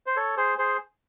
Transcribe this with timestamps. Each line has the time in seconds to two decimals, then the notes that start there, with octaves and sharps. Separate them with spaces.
0.06 C5
0.16 A4 C#5
0.37 G#4 C5
0.58 G#4 C5